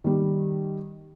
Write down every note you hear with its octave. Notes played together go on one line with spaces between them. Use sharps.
D#3 G3